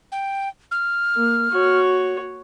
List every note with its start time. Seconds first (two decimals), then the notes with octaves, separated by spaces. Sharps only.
0.12 G5
0.71 F6
1.16 A#3
1.51 F#4 C#5